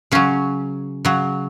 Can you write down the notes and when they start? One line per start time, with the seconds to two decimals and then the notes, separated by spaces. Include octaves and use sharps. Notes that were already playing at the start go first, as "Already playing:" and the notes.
0.12 C#3 F#3 C#4
1.05 C#3 F#3